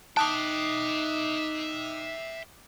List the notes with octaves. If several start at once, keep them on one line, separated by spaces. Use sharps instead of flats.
D#4 E5 G5 A5 D6 D#6 F#6